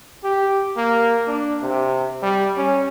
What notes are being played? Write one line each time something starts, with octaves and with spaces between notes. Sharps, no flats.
G4
A#3
D4
C3
G3
C#4